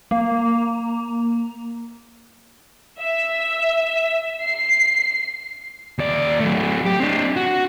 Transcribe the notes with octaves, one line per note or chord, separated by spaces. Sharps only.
A#3
E5
C7
D#2 D5
F#3 A3
G4
C4 D4
F#4